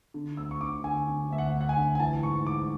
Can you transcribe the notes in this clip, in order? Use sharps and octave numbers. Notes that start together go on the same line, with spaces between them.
D3
D2 E6
C#6
D3 D6
D3 G#5
D3
D2 E5
F#5
D2
F#5
G#5
D3
G#5
E3 A5
G#2 C#6
G#2 D6